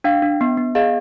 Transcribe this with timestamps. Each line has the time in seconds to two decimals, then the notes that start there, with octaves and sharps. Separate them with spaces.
0.04 D4 F5 G5
0.22 D4
0.41 B3
0.57 B3
0.75 G#4 D#5 F5